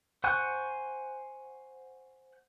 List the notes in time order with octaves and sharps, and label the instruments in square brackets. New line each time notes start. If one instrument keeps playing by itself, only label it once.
[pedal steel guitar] C5 F#5 G#5 C#6 F#6